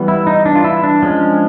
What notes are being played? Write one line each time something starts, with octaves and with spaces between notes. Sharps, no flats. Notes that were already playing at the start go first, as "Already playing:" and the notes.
Already playing: E3 G3 B3
E4
D#4
D4
F4
E4
D4
F3 G#3 C#4